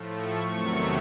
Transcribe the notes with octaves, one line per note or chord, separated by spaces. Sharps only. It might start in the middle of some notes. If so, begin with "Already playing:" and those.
Already playing: A2 F3 A3
C#6
E2 C3 D#3 F#3 A3 C#6